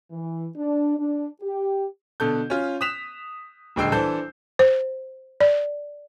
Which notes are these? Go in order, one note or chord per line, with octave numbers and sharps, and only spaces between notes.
E3
D4
D4
G4
B2 D3 A4 G6
C#4 F4
D#6 F#6 B6 E7 F7
D#1 D2 G#3 G5 E6 C7
E3 D4 A4 C5 G6
C5
D5